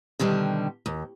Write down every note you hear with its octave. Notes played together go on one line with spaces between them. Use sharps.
B2 D3 D#3 G3
D#2